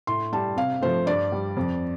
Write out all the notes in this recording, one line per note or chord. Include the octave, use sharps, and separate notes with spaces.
A2 C6
G3 A5
C3 F5
F3 A3 C5
G2 D5
G3
F2